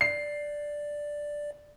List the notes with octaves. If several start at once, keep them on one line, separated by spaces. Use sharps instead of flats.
D5 C7